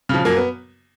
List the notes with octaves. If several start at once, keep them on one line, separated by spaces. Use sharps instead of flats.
C#3 F3
F#2 A#3
B3